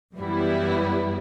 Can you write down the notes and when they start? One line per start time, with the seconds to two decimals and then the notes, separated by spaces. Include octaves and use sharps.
0.15 F#2 E3 G3 B3 E4